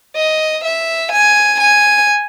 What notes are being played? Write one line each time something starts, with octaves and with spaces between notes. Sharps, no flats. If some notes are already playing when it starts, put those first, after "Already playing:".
D#5
E5
G#5
G#5